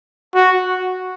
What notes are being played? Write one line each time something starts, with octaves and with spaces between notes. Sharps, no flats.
F#4